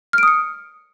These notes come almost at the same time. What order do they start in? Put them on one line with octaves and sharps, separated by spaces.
F6 D7 D#6 C#7